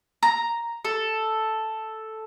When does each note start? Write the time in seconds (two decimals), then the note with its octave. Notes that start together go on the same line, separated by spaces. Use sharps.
0.23 A#5
0.85 A4